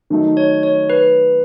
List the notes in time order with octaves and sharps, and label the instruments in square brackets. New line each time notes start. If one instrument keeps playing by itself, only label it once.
[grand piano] D#3 F#3 A3 D#4
[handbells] C#5
C#5
B4